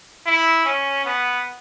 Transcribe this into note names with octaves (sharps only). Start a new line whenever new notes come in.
E4
C#4
B3